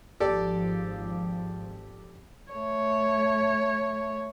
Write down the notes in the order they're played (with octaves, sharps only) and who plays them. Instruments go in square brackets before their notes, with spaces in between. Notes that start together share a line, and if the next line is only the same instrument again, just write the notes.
[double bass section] G#1 F3 [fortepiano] G4 A4 D5
[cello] A3 C#5